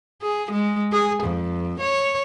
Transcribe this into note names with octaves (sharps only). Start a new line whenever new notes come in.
G#4
G#3
G#4
F2
C#5